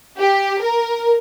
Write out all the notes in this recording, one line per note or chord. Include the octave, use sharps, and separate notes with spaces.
G4
A#4